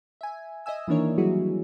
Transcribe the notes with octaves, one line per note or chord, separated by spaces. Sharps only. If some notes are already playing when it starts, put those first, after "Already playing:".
E5 G#5
D#5 E5 G#5 E6
D#3 E3 A#3 D4 A#4 C#5
F#3 G3 E4 F#4 G#4